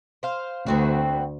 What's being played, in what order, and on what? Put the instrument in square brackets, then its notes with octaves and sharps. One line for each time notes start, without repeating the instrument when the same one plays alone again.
[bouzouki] C5 F5
[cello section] D2 [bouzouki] B3 C4 F#4